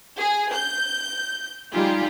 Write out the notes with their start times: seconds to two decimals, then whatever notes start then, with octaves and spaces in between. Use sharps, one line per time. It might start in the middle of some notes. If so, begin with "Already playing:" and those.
0.19 G#4
0.54 G6
1.73 G3 D#4 F4 G4 G#4